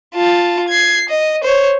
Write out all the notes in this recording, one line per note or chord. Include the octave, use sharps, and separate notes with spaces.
F4 A5
G#6 C7
D#5
C5 C#5